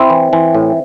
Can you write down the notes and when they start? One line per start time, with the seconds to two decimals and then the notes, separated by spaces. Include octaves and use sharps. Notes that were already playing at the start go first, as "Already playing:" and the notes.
Already playing: C4 E4
0.10 E3
0.33 E3
0.55 A2